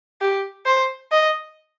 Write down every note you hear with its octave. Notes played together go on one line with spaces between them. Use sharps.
G4
C5
D#5